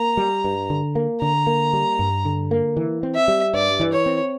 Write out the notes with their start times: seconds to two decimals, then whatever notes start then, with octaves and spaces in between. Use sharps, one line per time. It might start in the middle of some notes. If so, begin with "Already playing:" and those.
Already playing: A#3 A#5
0.17 G3
0.44 G2
0.70 D3
0.95 A#3
1.21 D3 A#5
1.47 A#3
1.73 G3
1.99 G2
2.25 D3
2.51 A#3
2.77 E3
3.03 C4
3.15 E5
3.28 G3
3.54 G2 D5
3.80 E3
3.93 C#5
4.06 C4